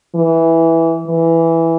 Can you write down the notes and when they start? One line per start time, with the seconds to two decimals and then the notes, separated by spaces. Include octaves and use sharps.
0.16 E3
1.07 E3